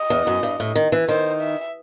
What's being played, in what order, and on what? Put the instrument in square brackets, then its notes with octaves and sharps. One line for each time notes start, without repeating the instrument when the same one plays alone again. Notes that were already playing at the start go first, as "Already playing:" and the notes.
Already playing: [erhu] D#5
[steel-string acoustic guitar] E2
F#2
G2
A2
D#3
E3
[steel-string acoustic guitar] D#3 [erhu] C5
[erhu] E5